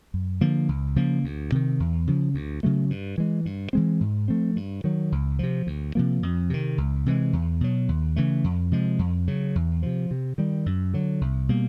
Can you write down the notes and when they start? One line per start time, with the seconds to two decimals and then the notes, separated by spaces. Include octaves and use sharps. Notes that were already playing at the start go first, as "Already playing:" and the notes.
0.14 F#2
0.41 D3 F3 A#3
0.69 C#2
0.96 C#3 F3 A#3
1.24 D2
1.52 C3 D#3
1.80 E2
2.07 C#3 F3
2.34 D2
2.63 C#3 F#3 A3
2.90 G2
3.18 E3 G#3
3.46 G2
3.73 E3 G#3 C4
4.01 G#2
4.28 F3 A3 C4
4.56 G2
4.84 D#3 F#3
5.12 C#2
5.39 C3 F3
5.67 D2
5.95 C3 F3 A#3
6.23 F2
6.50 C3 D#3
6.78 C#2
7.06 C3 E3 G#3
7.33 E2
7.61 B2 F#3
7.89 D#2
8.16 C#3 E3 A3
8.44 F2
8.72 C3 F3 G#3
8.99 F2
9.28 C#3 F#3
9.55 E2
9.83 C3 F3
10.11 C3
10.38 D#3 G3
10.66 F#2
10.94 D3 F#3
11.21 C2
11.49 B2 G3 A#3